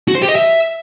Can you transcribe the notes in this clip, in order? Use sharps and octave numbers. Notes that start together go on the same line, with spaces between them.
F#4
C5
G4
D#5
E5